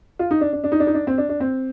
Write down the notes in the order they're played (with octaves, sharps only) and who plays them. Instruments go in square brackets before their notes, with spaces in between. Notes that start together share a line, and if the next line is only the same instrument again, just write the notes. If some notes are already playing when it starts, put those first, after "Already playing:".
[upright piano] F4
D#4
D4
D4
D4
D#4
D4
D#4
D4
C4
D4
D4
C4